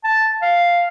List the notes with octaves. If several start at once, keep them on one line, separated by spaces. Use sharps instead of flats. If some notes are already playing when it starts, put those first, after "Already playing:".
A5
F5